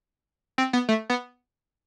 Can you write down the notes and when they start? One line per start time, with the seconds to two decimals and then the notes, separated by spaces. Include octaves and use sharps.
0.58 C4
0.73 B3
0.89 A3
1.10 B3